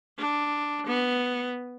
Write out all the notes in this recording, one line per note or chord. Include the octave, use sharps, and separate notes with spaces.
D4
B3